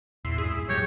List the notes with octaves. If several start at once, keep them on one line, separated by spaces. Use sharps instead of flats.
E2 A#2 E4 C6
C2 F2 G#2 E4 G#4
A1 F#2 A#2 F#3 G3 G4 C#5